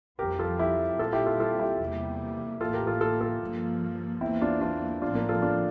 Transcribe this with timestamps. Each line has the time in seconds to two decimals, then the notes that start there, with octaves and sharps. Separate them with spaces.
0.19 F2 E3 G3 C4 G4 A#4
0.39 F4 A4
0.59 E4 G4
0.99 A#2 G3 C4 F4 A4
1.13 E4 G4
1.26 F4 A4
1.40 F4 A4
1.60 E4 G4
1.79 E2 C3 G3 A#3
2.61 A2 E3 A#3 F4 A4
2.74 G4 A#4
2.87 F4 A4
3.01 F4 A4
3.21 F4 A4
3.41 G2 F3 A#3
4.21 E2 E3 A#3 C4 E4
4.41 D4 F4
4.61 D4 F4
5.02 A2 F3 C4 D4 F4
5.15 A#3 D4
5.29 F4 A4
5.42 D4 F4